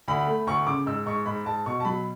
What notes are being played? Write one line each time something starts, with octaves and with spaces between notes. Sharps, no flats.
D2 B5
A3
D2 C#6
C#3 D6
G#2 E6
G#2 C#6
G#2 B5
G#2 A5
B2 C#6
A5
F#3 B5